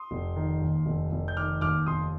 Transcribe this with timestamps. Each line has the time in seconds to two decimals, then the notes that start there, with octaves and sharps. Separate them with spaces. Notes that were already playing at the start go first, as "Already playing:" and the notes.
Already playing: C6 D#6
0.11 F1
0.36 D#3
0.62 D#2
0.86 F1
1.12 F1
1.28 G6
1.37 D#3 D6 F6
1.61 D#2 D6 F6
1.86 F1 C6 D#6